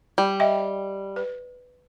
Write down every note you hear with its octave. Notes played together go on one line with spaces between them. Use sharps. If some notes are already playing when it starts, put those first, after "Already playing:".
G3
D#5 E5 G5
B4